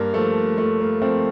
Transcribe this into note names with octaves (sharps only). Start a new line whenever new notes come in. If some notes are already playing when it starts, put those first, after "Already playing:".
Already playing: G2 A#3
F3 A3
G2 A3
A#3
F3 A3 C4